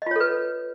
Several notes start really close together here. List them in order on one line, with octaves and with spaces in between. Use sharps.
D#5 F4 C#5 A4 B4